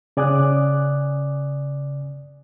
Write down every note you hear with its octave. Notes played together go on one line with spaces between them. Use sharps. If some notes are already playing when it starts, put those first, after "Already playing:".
C#3 D5 G#5 D6 D#6 F#6